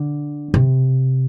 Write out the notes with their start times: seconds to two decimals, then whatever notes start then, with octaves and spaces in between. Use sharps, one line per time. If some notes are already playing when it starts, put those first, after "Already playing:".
Already playing: D3
0.54 C3